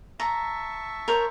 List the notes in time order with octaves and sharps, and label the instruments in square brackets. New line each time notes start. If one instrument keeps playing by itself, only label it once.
[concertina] E5 A5 C#6 [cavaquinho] A#5
[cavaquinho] A#4 C5 C#5